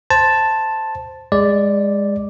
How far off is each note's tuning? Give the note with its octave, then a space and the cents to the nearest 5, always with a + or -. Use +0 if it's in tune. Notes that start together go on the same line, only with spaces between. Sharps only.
C5 +0 A5 +0
G#3 -20 D5 +0